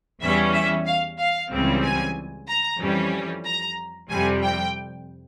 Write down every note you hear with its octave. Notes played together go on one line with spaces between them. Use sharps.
E2 E3 G3 C#4 E5
E5
F5
F5
C#2 C#3 E3 G3 C4
G#5
A#5
F2 E3 G3 C#4
A#5
F2 C3 G3 G#5
G5